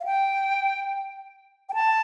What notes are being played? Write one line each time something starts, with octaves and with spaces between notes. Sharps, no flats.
F5
G5
G5
A5